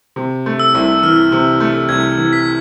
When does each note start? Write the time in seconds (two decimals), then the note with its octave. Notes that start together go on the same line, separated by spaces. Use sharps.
0.16 C3
0.46 A3
0.60 E6
0.74 C2
1.03 E3 F6
1.32 C3
1.60 A3
1.89 C2 G#6
2.18 E3
2.33 B6